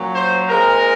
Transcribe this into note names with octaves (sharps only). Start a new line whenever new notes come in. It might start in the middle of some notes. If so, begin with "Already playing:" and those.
Already playing: A#2 F#3 C#4
C5
A#2 G#3 C4 A#4